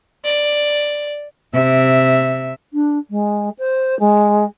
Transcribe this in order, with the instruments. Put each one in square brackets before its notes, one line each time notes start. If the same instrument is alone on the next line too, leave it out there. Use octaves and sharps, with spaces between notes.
[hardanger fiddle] D5
[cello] C3 E5
[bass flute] D4
G#3
C5
G#3